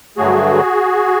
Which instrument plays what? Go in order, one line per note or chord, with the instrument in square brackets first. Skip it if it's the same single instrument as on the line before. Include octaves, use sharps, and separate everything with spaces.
[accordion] G2 D3 F#3 A3 F#4 G#4